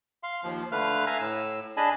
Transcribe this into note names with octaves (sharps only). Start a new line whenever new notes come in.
F5 C6
D#2 F3
D3 A3 B4 F5 F6
E5 F5 G#5 A#5
A2 E6
D4 G#4 D#5 G#5 A5 B5